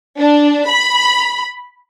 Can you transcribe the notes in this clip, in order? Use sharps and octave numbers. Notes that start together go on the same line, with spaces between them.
D4
B5